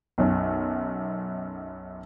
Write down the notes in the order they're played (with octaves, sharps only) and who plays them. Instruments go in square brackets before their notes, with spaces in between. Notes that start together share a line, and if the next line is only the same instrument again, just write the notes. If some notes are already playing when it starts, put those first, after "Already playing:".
[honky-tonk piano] B1 F#2